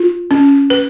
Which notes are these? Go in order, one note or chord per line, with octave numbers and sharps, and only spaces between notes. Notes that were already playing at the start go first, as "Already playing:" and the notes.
Already playing: F4
C#4
B4